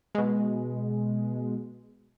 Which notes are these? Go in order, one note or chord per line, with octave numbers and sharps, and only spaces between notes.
B2 G#3